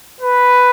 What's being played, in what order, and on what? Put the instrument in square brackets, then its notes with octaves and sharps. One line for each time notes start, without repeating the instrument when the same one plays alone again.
[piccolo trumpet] B4